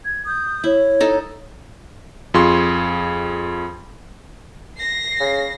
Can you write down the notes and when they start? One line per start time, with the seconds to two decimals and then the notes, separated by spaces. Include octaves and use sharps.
0.04 G#6
0.26 D#6 G6
0.64 E4 C#5
1.00 D#4 A4
2.34 F2 F4 G#4 C6 C#6
4.77 A#6 C7
5.20 C#3